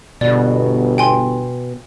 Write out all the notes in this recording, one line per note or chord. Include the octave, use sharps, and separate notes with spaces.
G1 B2 D5
G5 G#5 C6